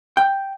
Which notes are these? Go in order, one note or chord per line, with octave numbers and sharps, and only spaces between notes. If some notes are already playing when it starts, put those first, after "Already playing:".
G5